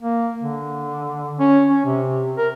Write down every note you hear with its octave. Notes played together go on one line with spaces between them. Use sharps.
A#3
D3
C#4
C#4
C3
A#4